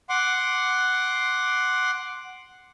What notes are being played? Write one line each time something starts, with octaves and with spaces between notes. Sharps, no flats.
F#5 C6 D6